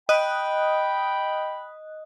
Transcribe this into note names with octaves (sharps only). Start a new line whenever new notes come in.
D#5 G5 B5 D#6 F#6